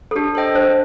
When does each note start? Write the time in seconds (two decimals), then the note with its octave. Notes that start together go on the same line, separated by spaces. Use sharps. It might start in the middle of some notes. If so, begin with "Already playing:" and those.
0.11 A4
0.16 D4 G4
0.35 A4 C5 D#5 G5
0.54 D4 C5